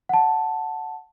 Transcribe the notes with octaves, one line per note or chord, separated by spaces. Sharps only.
F#5 A5